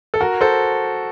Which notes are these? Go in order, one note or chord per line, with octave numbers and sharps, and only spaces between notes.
A4
F#4 A#4
A4 C5